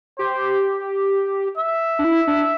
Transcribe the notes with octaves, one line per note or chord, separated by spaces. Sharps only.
G4 C5
E5
D4
E4
D4